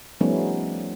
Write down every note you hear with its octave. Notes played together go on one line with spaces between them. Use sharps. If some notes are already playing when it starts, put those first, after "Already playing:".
F3 G3 A3 B3 C#4 D#4